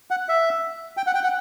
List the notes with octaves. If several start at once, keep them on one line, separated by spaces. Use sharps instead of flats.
F#5
E5
G5
F#5
G5
F#5